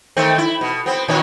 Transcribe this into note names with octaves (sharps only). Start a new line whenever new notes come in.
D#3 A3 C4
E4
B2
B3 C4
A#2 D#3 C#4